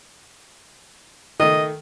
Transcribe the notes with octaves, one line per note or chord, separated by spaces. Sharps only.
D#3 A3 D#5